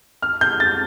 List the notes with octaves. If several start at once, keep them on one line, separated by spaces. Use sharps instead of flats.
F6
G6
A6